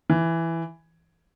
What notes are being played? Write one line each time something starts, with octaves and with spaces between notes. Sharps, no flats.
E3